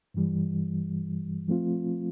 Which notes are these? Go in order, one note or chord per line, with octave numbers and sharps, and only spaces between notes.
G2 E3 G3
F3 A3 C4 F4